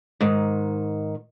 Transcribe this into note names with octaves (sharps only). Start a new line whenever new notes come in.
G#2 D#3